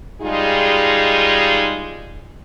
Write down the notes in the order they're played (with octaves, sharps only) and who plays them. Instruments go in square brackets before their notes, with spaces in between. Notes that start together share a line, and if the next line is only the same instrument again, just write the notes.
[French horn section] G3 G#3 D#4 F4 G#4